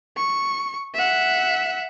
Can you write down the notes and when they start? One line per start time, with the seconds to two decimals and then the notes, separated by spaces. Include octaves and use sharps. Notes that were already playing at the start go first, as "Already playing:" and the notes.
0.17 C#6
0.94 E5 F#5